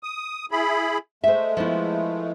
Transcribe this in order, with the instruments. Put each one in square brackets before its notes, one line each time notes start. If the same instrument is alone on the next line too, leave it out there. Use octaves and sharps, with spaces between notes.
[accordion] D#6
E4 G#4 B5
[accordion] G#3 A3 [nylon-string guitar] C5 E5
[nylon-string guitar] F3 B3 E4